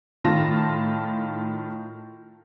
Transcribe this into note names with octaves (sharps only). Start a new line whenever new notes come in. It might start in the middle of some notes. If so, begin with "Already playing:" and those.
A2 D#3 F4 A5 A#6